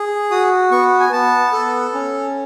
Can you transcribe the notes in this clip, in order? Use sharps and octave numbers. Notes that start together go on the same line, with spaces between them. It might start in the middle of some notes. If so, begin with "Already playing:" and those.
Already playing: G#4
F#4 D#6
B3 C#6
G#5
B3 A5
A4
C#4